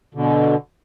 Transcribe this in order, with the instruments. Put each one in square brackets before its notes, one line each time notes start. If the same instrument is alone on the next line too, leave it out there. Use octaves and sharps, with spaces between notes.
[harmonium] B2 D3